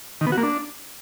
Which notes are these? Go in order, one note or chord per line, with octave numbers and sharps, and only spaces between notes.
D#3
B3
F#4
A#3
D4